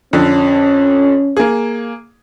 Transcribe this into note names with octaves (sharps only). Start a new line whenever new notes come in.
F2 D3 C#4
A#3 G#4